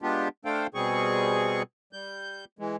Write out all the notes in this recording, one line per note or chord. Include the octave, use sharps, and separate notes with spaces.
G#3 B3 D4 F4 G4
A3 D4 A4 C5 F5 G5
B2 G3 C4 G#4 C#6
G3 G6
E3 G#3